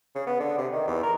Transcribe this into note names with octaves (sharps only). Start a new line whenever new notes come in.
C#3
B3
D3
C3
D#3
E2
A#4